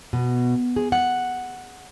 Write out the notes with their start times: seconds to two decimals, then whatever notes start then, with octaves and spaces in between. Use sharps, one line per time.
0.13 B2
0.76 G#4
0.92 F#5